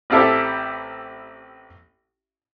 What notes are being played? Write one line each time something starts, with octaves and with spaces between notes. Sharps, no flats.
A1 C4 E4 G4 A4 E5